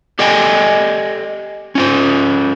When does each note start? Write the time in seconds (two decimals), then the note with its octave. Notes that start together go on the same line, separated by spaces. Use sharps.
0.19 G4 A4 D5 D#5 G5 G#5
1.75 C#4 F4 C5